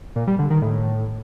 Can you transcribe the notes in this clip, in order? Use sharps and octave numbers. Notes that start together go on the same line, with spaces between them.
A#2
G3
D3
D#3
A2